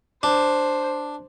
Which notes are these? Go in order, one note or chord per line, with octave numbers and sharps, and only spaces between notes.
D4 C5